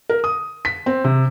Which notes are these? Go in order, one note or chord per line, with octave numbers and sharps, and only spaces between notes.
A#4
D#6
B6
C4
C3